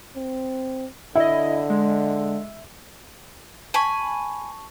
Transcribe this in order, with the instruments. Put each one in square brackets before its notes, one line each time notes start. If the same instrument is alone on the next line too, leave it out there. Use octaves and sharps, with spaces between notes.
[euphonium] C4
[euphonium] D3 [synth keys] E4 D#5 [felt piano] E5
[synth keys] G#3
[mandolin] G#5 B5 [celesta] A5 C#6